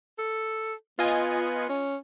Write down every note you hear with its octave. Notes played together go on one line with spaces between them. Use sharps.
A4
B3 F4 D#5 G#5
C#4